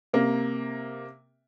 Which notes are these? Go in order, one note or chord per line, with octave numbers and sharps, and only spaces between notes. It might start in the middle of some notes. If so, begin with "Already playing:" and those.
C3 A#3